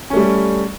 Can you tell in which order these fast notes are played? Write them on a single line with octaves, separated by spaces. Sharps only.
C#4 A3 G3